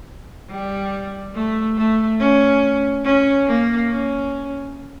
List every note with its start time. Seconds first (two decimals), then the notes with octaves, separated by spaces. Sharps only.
0.50 G3
1.34 A3
1.77 A3
2.19 C#4
3.04 C#4
3.47 A#3
3.88 C#4